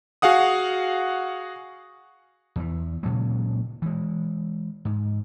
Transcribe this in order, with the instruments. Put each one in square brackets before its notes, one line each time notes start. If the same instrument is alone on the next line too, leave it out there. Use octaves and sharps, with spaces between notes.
[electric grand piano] F#4 G#4 F5 F#5 D#6
[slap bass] E2 E3
A#2 C#3 F#3 G#3
E3 G#3
G#2